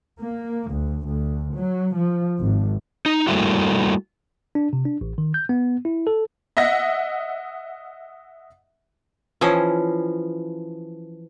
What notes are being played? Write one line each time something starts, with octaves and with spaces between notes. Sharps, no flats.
A#3
D2
D2
F#3
F3
G#1
D#4
G3 A3 A#3 E4 F#4
D4
C3
D4
A1
D#3
G6
B3
E4
A4
D#5 E5 F#5 A#6
E3 F3 C#4 D#5